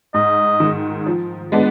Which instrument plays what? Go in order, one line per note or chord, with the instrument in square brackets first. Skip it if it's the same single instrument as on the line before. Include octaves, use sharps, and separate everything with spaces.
[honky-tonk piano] G#2 [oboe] D#5
[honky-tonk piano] D#3 G#3
F3
G#3 B3 D4